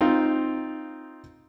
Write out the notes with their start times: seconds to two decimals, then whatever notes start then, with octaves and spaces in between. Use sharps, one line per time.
0.01 C4 D#4 F4